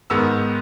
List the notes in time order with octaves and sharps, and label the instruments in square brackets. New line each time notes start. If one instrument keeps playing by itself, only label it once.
[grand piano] G#2 D#3 G#3 B3 E6